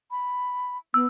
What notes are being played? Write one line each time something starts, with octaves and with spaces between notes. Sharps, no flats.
B5
B3 E6